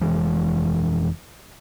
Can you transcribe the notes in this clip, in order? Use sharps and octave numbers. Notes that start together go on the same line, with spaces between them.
F1 E3 G#3